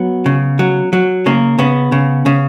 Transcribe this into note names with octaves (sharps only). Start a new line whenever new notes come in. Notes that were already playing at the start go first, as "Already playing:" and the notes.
Already playing: F#3 B3
C#3
F#3
F#3
C#3 A#3
C#3 B3
C#3
C#3